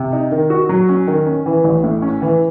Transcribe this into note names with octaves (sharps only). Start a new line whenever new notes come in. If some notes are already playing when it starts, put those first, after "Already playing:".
Already playing: C3
D#4
D#3
F#4
F#3
C#4
D#3
C#4
E3
A1
A2
C#4
E3